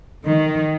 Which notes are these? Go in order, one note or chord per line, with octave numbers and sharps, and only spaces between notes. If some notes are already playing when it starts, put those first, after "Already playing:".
D#3